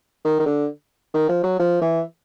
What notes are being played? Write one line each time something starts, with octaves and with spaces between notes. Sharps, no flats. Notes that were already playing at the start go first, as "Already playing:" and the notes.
D#3
D#3
D3
D#3
F3
F#3
F3
E3